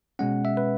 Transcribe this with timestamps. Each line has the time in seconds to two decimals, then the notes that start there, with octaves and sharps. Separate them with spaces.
0.19 B2 G#3 C#4 F#5
0.45 E5
0.57 B4